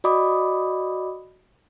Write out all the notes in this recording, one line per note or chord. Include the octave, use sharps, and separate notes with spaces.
F#4 D5 D#5 B5 D6 D#6